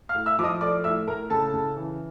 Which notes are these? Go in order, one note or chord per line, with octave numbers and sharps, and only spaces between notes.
F5 F6
A2
E5 E6
F3 D#5 D6 D#6
A3 D5 D6
A2 E5 E6
A2 A#4 A#5
C#3 A4 A5
C#3
E3